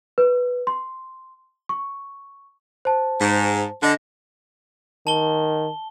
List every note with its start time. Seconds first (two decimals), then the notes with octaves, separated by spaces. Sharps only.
0.18 B4
0.67 C6
1.69 C#6
2.85 C5 A5
3.21 G#2
3.83 D3 D4 D#5 A#6
5.07 D#3 A5 G7